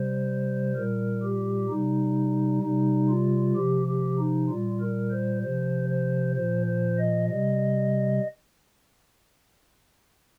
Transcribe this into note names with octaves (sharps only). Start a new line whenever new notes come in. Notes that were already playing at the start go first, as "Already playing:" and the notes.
Already playing: C3 G3 C5
A#2 G3 A#4
G4
C3 G3 D#4
C3 G3 D#4
F4
C3 F3 G4
G4
D#4
A#2 G3 F4
A#4
C5
C3 F3 C5
C5
A#2 F3 C5
C5
D#5
C3 G3 D#5